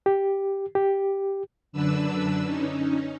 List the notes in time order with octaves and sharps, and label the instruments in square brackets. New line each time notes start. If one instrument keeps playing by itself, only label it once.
[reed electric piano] G4
G4
[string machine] F#2 D3 D4 B4 E6
C#4 D#4